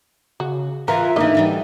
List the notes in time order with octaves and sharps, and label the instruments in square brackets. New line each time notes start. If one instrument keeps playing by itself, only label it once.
[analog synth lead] C#3 [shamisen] F#4
[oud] E3 [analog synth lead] F4 [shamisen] A#4 [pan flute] E5
[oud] D2 D#3 E3 [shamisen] A#3 D#5 [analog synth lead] D#4
[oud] D3 E3 G3